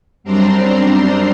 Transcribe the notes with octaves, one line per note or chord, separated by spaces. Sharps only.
F#2 G3 C4 D4 A#5 C6